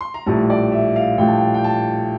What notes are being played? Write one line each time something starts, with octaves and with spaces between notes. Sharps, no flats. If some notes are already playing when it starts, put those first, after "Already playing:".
C6
A#5
A#1 A2 G3 A5
D5
E5
F5
A#1 A2 G3 G5
A5
G5
G5
A5